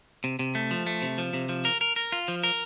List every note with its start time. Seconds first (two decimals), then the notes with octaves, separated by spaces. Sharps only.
0.24 C3
0.39 C3
0.55 A3
0.71 F3
0.87 A3
1.02 C3
1.18 F3
1.34 C3
1.49 F3
1.65 A#4
1.81 A#4
1.96 A#4
2.12 F4
2.28 F3
2.43 A#4